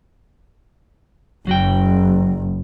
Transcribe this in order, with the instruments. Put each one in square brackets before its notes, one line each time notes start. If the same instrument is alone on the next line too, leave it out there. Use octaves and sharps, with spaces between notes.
[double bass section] F#1 [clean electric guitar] F#3 F#4 G5